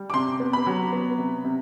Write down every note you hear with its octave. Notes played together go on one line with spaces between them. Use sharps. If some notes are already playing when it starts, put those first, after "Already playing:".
Already playing: G3
D6
C3 C6
B3
B5
F#3
B3
C3
C3